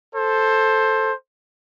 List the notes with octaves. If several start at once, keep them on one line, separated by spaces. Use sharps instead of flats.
A4 C5